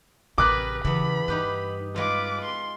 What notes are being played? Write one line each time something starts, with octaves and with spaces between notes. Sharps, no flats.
A1 C3 G4 G#4 A#4 B4 D6 F#6
E2 C#3 B3 B5
G2 D#4 G4 B4
G#3 F4 B4 D6
C6